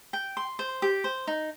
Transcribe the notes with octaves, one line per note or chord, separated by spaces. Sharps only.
G5
C6
C5
G4
C5
D#4